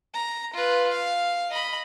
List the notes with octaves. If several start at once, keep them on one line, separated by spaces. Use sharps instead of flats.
A#5
F4 B4
F5
D#5 B5